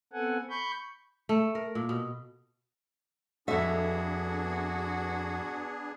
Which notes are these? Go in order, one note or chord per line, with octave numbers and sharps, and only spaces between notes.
B3 C4 A4 F#5 G#5
B5 C#6 G6
A3
A#4
A#2
B2
F2 B3 D4 F#4 G#4 E5